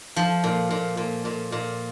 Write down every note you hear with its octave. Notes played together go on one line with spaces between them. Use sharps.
F3
A#2
A#2
A#2
A#2
A#2